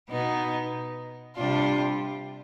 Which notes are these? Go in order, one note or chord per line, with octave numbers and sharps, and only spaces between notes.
B2 B3 D#4
C3 G3 D4 F4